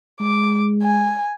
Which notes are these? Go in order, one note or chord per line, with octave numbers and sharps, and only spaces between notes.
G#3 D6
G#5